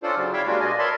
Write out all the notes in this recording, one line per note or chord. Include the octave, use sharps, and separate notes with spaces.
C#4 D4 F4 A4 C5 D5
C#3 F#3
E4 C#5 D5 E5 F5 G5
G3 G#3 A#3 D4 F4 F#4
B2 D5 D#5 G#5
A#4 C#5 E5 A5 B5 C6